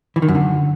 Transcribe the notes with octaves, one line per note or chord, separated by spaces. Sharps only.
E3
D#3
F#2
D3